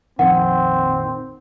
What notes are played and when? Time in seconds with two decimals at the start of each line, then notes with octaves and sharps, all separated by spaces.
0.19 A#1 F2 D#3 C4 F#5